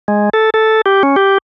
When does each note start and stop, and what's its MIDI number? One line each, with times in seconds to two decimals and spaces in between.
0.08 0.29 56
0.33 0.50 69
0.54 0.81 69
0.86 1.03 67
1.03 1.16 61
1.16 1.38 67